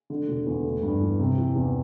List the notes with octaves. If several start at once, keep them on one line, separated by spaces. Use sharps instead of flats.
D3
E1
E2
A3
G2
E3
C3
E3
E2